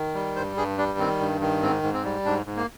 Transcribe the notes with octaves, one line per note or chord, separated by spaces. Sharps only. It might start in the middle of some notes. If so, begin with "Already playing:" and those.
Already playing: D#3
G3
G2 C5
G2 G#4
G3 D4
D#3 C4
G2
D#3
G#2 C4
G#2
C4
G3
G#2 D4
G#2
A#3